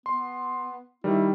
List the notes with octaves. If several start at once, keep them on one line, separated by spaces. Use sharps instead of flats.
B3 C6
D#3 G3 E4